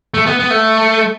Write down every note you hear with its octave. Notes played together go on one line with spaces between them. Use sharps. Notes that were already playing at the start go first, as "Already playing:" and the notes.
A3
B3
B3
A3